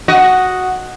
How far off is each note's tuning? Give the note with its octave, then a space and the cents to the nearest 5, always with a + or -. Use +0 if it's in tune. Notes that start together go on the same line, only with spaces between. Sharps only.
F#4 +0 D#5 +0